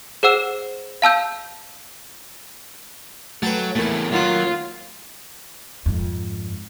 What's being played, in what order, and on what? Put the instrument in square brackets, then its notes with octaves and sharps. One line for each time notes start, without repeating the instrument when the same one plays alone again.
[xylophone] G#4 C5 F#5 E6 E7
F5 A5 E6 G6
[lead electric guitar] F#3 [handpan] A3 [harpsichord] B4 G5 A5
[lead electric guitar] E2 A2 [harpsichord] A3 E4 [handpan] A#3 A#4
[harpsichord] F#2 D#3 F#5 [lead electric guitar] F#3 [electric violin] F4
[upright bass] F2 G#2